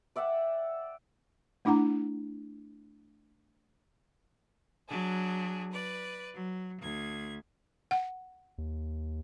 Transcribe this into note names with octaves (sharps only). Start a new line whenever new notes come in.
D5 E5 F#5 G5
A3 D4 E4 F#5 A#5
F#3 D4 G#4
B4 D5
F#3
D2 G#6
F#5
D#2